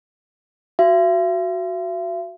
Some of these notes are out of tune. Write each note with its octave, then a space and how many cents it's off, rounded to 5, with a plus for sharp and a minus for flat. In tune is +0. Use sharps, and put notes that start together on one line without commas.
F#4 +0 E5 +45